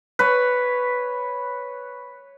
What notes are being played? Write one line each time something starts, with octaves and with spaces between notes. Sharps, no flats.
B4 C#5